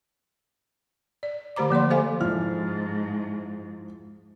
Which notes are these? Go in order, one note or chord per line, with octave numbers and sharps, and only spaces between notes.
D5
D3 A3 G4 C5 A#5 D6
F3 A#3 D5 C6
G4 A4 C5 D#5 F5 G#5
G#2 F3 E4 F6